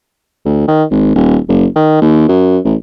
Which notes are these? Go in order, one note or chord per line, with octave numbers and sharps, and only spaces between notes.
D2
D#3
G#1
D#1
F#1
D#3
D#2
F#2
A1